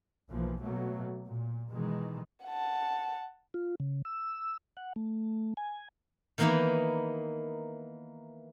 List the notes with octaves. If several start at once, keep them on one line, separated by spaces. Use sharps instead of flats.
B1 E3 F3 A#3
B2 F#3 A3 A#3
A#2
B2 D#3 E3 G#3
F#5 A5
F4
C#3
E6
F#5
A3
G#5
D#3 E3 A#3 B3 D#4 E4